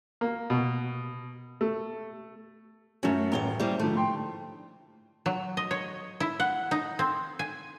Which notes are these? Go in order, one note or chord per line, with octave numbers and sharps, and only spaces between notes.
A#3
B2
A3
F#2 A3 C#4 F#4
D#1 A1 A#2 F#3 A#5 G7
G3 A#3 E4 C5
G#2 D3 F3 A3
G5 C6
F#3
D#5
C#5
E4
F#5
D#4
C4
G#5